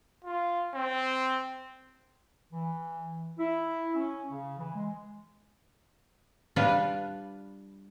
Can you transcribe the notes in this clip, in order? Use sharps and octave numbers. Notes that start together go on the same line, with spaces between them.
F4
C4
E3
E4
C#4
C#3
E3
G#3
G3 D4 F4 B4